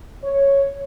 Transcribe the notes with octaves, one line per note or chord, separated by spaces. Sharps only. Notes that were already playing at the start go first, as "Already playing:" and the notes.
C#5